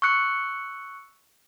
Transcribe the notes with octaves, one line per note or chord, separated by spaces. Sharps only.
C#6 E6 F#6 C#7